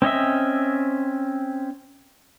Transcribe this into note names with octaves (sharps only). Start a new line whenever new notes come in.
C4 C#4 D#5 E5